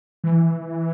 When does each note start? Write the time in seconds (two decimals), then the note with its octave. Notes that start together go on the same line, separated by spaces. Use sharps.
0.24 E3